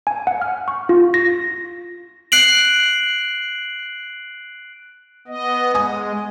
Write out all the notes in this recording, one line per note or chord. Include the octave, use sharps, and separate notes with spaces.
G#5
F#5
F6
C#6
F4
A#6
F#6 C7 D7 F#7
B3 D#5
G#3 G#5 D#6